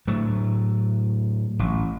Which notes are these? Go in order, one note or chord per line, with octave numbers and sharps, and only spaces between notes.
A2 F#3 A3
A1